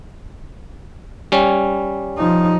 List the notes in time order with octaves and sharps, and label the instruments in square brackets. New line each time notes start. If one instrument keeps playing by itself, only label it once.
[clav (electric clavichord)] G3 C#4
[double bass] F3 D#4